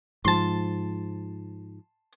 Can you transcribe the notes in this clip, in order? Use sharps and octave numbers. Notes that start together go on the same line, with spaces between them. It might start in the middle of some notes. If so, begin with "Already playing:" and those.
G#2 F3 A5 C6